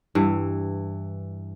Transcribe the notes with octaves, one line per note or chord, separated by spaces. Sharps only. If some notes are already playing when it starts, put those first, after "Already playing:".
G2 E3